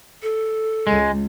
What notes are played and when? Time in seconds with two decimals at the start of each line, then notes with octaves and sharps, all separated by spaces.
0.23 A4
0.87 C#2 G#3